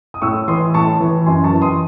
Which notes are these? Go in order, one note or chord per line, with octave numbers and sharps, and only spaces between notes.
D#6
A2 C#6 E6
E3 C6 D#6
A2 A5 C#6
E3
F#2 G#5 C6
A5 C#6
E3
C6 D#6